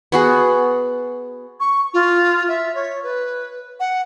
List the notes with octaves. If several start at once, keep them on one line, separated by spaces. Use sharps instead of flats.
B3 F#4 G#4
C#6
F4
E5
C#5
B4
F#5